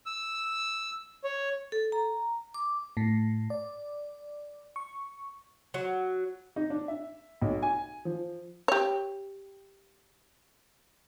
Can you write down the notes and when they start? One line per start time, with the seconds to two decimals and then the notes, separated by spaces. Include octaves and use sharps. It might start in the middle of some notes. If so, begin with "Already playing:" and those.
0.06 E6
1.24 C#5
1.72 A4
1.92 A#5
2.54 D6
2.97 A2
3.50 D5
4.76 C#6
5.74 F#3
6.56 D#4
6.70 D4
6.88 E5
7.41 B1
7.63 G#5
8.05 F3
8.68 G4 C#5